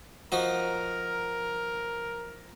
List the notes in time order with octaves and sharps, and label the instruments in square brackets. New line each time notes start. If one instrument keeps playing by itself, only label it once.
[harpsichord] F3 D#4 F#4 [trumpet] A#4